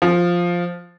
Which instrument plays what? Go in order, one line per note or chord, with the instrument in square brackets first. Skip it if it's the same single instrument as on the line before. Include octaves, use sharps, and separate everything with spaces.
[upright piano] F3